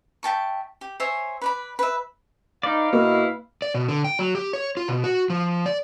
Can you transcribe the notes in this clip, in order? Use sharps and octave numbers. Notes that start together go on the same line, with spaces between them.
E5 G5 A5 C#6
G4
C5 C#5 E5 G#5
B4 D5 B5
B4 E5
D#4 B4 D5 F5
B2 A#3 E4
D5
B2
D3
G5
F#3
G4
C#5
F4
B2
F#4
F3
D5